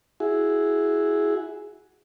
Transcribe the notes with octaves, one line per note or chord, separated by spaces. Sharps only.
E4 F#4 G#4